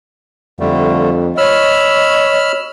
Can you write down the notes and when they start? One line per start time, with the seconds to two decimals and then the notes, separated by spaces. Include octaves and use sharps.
0.60 F2 D3 G3 A3
1.37 C#5 D#5 B5 E6 F6